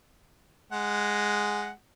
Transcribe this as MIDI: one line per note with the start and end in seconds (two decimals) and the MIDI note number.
0.72 1.71 56
0.72 1.71 78